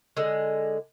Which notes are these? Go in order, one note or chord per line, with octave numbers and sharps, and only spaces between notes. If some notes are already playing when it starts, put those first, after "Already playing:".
D3 G#3